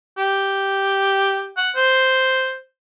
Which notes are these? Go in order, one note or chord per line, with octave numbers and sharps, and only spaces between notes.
G4
F#5
C5